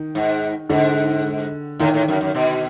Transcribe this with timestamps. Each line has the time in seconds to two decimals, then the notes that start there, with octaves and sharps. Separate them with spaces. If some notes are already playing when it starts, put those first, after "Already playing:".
Already playing: D#3
0.15 G#2
0.70 G#2 D3
1.79 A2 D#3
1.94 A2
2.08 F#2
2.21 F#2
2.35 B2